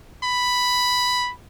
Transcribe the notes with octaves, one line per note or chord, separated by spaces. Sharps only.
B5